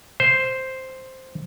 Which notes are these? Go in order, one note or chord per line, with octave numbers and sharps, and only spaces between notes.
C5